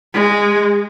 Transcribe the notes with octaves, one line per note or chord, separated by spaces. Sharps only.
G#3